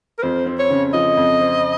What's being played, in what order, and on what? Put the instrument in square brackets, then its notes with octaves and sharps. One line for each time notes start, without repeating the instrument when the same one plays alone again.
[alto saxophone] A#4
[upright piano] F2 [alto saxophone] C5
[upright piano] C4
[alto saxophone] C#5
[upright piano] C#3
[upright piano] F3 [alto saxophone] D#5
[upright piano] F2
C4